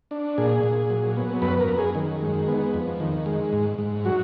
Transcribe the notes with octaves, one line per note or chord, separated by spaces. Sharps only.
D4
A#2 G#4
A#2
F#3
B3
F#2 B4
A#4
F#2
G#4
D#3
G#3
B3
F2
D#3
G#3
G#2
G#2
F#3 F#4